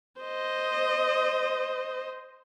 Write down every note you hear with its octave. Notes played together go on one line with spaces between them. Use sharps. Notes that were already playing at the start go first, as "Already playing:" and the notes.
C5 D#5